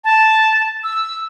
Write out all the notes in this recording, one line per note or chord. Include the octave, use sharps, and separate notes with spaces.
A5
E6